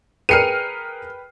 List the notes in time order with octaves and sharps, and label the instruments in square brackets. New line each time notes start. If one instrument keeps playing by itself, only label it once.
[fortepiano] G#4 A#4 [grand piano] B4 G5 C7 [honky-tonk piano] F6 C#7 D#7